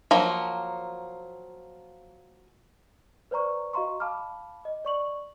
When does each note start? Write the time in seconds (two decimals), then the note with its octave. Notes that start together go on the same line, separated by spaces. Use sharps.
0.11 F3 F#3 A#3
3.31 B4 C5 D5 A#5 C#6
3.73 F#4 D#5 F5 A#5 C6 C#6
4.00 F5 A5 B5 D6 F6
4.65 D#5
4.85 D5 C#6 F#7